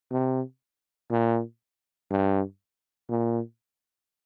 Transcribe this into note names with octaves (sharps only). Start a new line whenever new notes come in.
C3
A#2
G2
A#2